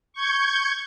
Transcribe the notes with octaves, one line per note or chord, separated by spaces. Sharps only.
C#6 G6 G#6